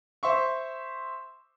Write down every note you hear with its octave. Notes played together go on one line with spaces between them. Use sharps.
C5 E5 C6 C#6